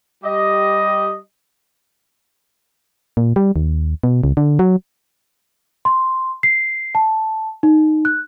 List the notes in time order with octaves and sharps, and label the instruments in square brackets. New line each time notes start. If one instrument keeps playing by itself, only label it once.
[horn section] G3 G4 D#5
[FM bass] A#2
G3
D#2
B2
C#2
D3
F#3
[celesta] C6
C7
A5
D#4
F#6